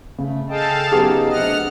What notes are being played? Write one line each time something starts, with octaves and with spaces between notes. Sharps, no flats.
C#3 A3
G#4 A4 D#5 F5 G5 A5
C#3 F#3 B3 D#4 G4 G#4
D2 C3 D#5 F#5 F6